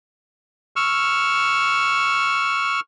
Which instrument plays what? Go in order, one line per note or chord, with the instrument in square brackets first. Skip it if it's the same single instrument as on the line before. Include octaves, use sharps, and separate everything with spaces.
[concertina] C#6 E6 F6